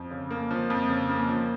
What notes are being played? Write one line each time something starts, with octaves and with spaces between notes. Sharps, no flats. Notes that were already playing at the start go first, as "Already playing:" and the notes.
Already playing: F2 F3
C#3
A#3
F3
F2
C#3
A#3
F3